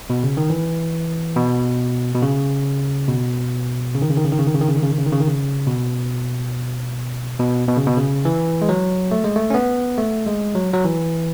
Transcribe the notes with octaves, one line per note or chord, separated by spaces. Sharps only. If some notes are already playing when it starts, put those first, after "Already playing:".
B2
C#3
D#3
E3
B2
B2
C#3
B2
C#3
D#3
C#3
D#3
C#3
D#3
C#3
D#3
C#3
D#3
C#3
D#3
C#3
D#3
C#3
D#3
C#3
D#3
C#3
B2
B2
B2
C#3
B2
C#3
E3
G#3
F#3
A3
G#3
A3
C#4
B3
A3
G#3
F#3
F#3
E3